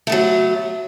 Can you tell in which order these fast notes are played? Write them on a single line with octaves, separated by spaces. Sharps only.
A3 B3 F#3